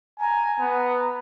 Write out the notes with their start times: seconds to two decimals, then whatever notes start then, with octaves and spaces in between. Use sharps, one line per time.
0.20 G#5 A#5
0.60 B3